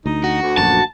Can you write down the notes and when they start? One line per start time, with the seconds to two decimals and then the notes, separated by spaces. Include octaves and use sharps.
0.06 D2 D#4
0.24 F#4
0.42 D2
0.58 A#1 F#2 A5